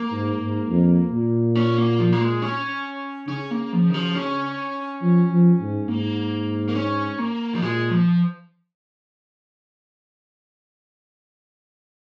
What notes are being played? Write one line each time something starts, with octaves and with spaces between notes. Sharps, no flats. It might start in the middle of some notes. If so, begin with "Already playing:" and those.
Already playing: A#3
G#2
G#2
F2
A#2
C#4
A#3
F3
A#3
G#3
C#4
C#3 C#4
A#3
F3
D#3
F3
C#4
F3
F3
G#2
G#2 A#3
A#3
C#4
A#3
F3
A#2 G#3
F3